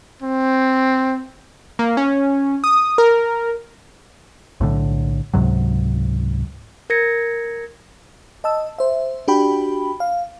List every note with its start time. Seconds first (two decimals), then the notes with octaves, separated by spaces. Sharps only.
0.22 C4
1.79 A#3
1.97 C#4
2.64 D#6
2.98 A#4
4.60 B1 A2 D3
5.34 C#2 G#2 C3 F#3
6.90 A#4 G#6 A#6 C#7
8.44 D#5 A5 E6
8.78 C5 E5
9.28 D4 F#4 G4 G5 B5
10.00 F5